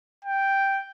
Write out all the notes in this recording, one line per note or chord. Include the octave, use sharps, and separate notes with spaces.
G5